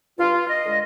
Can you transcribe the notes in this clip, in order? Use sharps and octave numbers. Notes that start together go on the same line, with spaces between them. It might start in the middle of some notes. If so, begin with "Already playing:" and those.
G2 F4
D#5
D3 G#3